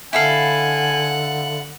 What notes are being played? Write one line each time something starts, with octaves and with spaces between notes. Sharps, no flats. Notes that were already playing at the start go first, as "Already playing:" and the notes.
D3 E4 A4 F5 F#5 G#5